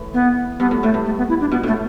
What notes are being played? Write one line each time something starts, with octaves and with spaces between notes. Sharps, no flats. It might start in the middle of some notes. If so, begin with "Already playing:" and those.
Already playing: A2 E3
B3
G2 B3
A2
A2 A3
G2
A3
B3
E4
D4
B2 B3
A2 A3